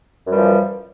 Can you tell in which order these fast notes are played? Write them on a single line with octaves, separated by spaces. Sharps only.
F#2 G3 E3 F3